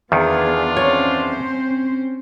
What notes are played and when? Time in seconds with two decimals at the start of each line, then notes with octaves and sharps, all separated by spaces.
0.12 E2 D#3 B3 D4 F4 G#4
0.77 C4 C#4 C5 C#5